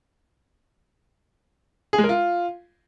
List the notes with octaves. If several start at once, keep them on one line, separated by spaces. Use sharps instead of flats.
G#4
G#3
A#4
F4